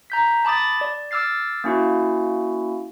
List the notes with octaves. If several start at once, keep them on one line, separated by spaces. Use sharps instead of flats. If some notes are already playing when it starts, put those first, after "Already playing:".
A#5 G6 B6
A5 B5 D6 D#6 A6
D5
D6 E6 F6 A6 C7
A#3 C#4 E4 F#4